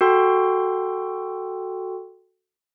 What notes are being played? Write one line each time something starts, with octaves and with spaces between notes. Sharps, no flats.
F#4 A4 G5 C6